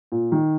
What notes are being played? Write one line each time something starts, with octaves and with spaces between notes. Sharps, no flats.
A#2
D#3